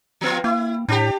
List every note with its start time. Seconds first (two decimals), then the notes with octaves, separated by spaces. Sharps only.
0.21 F3 B3 F4
0.44 A#3 E4
0.88 A2 D4 G4